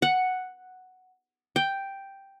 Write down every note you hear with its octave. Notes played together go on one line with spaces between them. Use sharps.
F#5
G5